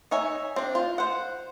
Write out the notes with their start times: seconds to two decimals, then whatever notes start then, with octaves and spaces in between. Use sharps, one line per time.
0.11 D#4 C#5 E5 G#5
0.56 C4 D4
0.75 F4
0.98 C5 F#5